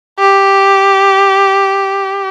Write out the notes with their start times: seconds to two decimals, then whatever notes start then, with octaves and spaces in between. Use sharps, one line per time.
0.19 G4